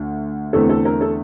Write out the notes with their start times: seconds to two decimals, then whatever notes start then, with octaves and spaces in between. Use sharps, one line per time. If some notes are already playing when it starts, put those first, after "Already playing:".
Already playing: D2 D3
0.53 E2 D3 A3 C4 A4
0.69 A4
0.85 A#4
1.01 A4